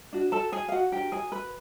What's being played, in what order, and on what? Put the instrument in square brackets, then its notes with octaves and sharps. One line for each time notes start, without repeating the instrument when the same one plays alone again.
[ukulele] D4 F#4
A4 A5
G#4 G#5
F5
F#4 F#5
D4 F#4 G4 A#4 G5
G#4 G#5
B4 B5